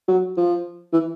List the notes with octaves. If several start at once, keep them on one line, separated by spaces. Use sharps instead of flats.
F#3
F3
E3